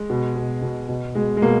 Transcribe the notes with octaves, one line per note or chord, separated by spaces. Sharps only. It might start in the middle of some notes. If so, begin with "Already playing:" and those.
Already playing: G#3
B2
B2
B2
B2
B2 G#3
G#3
B2 A#3